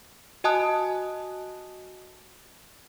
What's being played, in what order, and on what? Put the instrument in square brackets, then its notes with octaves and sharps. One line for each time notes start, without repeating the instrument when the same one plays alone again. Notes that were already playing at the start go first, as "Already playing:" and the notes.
[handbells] F#4 D#5 G#5 A5 D#6 F#6